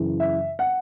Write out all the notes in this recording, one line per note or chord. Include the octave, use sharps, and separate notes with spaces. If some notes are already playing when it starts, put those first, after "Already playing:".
Already playing: F#2 C#3 E3
E5
F#5